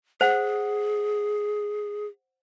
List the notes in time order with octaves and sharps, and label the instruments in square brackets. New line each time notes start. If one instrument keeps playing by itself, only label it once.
[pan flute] G#4 [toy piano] C5 F#5